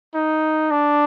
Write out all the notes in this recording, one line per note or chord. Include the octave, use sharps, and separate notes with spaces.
D#4
D4